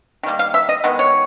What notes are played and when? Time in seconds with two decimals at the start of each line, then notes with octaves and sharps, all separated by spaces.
0.23 D#3 G3 A#3
0.39 F5
0.54 E5
0.69 D#5
0.84 D#3 G#3 B3
0.99 C#5